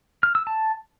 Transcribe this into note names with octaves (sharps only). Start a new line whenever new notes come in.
F6
E6
A5